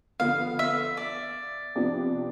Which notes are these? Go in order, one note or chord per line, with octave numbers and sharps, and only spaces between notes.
D3 F3 B3 F5
E5
D5
C3 F3 B3 D4 G4